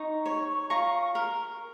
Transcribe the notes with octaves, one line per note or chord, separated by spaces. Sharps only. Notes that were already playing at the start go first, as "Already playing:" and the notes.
Already playing: D#4 A#5 C#6
C#5
F4 A#5 C#6
A#4